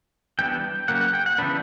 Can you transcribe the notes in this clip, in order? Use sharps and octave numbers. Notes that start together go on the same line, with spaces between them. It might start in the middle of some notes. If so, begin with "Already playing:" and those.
E3 G3 B3 D4 G5
C#3 F#3 A#3 F#5
F#5
G5
F#5
C#3 E3 B3 D4 B4